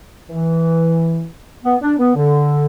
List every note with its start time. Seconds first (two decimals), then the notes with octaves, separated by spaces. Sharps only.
0.30 E3
1.64 B3
1.82 D4
1.99 B3
2.16 D3